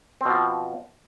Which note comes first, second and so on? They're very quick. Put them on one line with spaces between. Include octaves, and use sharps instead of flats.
C4 B2 F3